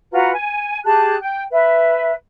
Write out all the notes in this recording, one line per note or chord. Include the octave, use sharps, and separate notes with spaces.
F4 F#4 B4 A#5
G#5
G4 G#4 A5 F#6
G5
B4 E5